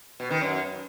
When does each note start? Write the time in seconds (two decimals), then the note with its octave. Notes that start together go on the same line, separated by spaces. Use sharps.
0.20 B2
0.30 D#3
0.41 F#2